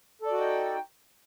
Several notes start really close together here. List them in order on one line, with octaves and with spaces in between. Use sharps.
A4 D5 F#4 D#4 G5